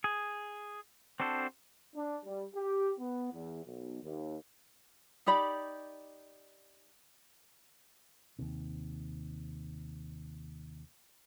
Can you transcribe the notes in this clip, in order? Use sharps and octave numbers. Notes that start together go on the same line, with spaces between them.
G#4
C4 D4 F#4 A4 C5
D4
G3
G4
B3
E2
B1
D#2
D#4 G4 D5 B5
D#2 C3